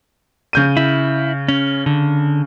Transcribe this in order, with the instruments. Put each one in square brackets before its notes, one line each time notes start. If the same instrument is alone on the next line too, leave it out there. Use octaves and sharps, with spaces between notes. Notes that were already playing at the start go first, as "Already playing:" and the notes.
[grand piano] C#3 G6 D#7
[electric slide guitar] E4
C#4
D3